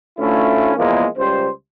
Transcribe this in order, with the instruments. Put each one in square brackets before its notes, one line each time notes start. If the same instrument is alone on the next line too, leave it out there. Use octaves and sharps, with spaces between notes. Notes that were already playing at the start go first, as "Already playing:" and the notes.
[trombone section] D2 A3 C#4 E4 F4
E2 F3 G#3 A#3
C#2 G3 C5